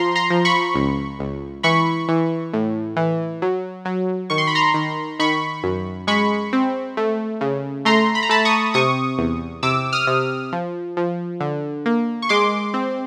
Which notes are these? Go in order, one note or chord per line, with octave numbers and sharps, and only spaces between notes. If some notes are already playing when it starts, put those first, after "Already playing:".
Already playing: F3 A#5 C6
A#5 C6
F3
B5 C#6
C#2
C#2
E3 B5 C#6
E3
A2
E3
F#3
F#3
D#3 C#6
C6
B5
A#5 C6
D#3
D#3 B5 C#6
F#2
G#3 B5 C#6
C4
A3
C#3
A3 A#5 C6
B5
A#5
A3 A5 B5
C#6 D#6
C3 C#6 D#6
E2
C3 D6 E6
D#6 F6
C3
F3
F3
D3
A#3
C#6
G#3 C6 D6
C4